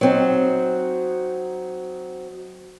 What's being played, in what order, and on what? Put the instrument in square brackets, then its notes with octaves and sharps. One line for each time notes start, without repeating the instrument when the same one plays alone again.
[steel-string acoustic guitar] F#3 C4 D#4